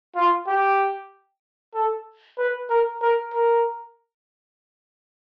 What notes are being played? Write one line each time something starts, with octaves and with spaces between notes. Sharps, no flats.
F4
G4
A4
B4
A#4
A#4
A#4